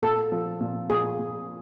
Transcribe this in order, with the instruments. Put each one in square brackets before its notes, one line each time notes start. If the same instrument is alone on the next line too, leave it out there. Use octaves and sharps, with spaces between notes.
[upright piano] A#2 [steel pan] A4
[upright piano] F3
A#2
[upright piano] A#2 [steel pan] G#4
[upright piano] A#2